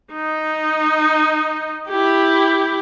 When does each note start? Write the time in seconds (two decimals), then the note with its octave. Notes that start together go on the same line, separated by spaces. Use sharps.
0.12 D#4
1.89 E4 G4